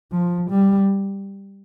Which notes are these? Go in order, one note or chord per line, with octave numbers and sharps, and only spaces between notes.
F3
G3